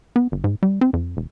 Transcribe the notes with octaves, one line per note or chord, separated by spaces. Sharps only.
B3
G1
G#2
G3
C4
F2
E1